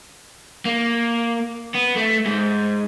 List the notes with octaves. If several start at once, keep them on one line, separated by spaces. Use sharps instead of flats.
A#3
B3
A3
G#2